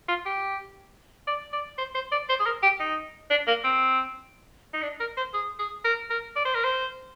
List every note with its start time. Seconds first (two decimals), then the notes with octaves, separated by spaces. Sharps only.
0.09 F4
0.26 G4
1.27 D5
1.53 D5
1.78 C5
1.95 C5
2.12 D5
2.29 C5
2.40 G#4
2.46 A#4
2.63 G4
2.80 D#4
3.30 D4
3.48 A#3
3.64 C4
4.74 D#4
4.83 D4
5.00 A#4
5.17 C5
5.34 G#4
5.59 G#4
5.85 A#4
6.10 A#4
6.36 D5
6.45 C5
6.55 A#4
6.64 C5